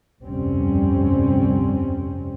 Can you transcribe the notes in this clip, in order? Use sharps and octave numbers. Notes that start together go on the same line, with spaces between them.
F1 D2 G2 G3 C4 C#4